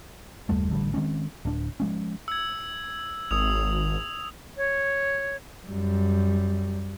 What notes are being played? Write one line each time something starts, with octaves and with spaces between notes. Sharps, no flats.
F#1 D#2 G3 A3
A1 D3 G3
D#3 G#3 C4 C#4
D1 D4
F3 G#3 C#4
E6 G#6
G#1 D#6 E6 F7
C#5
F#2 G3